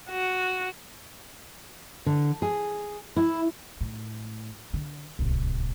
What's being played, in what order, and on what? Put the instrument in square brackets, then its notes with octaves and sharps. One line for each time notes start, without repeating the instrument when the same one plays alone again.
[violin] F#4
[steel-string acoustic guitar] D3
G#4
E4
[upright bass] A2
D3
D1 C2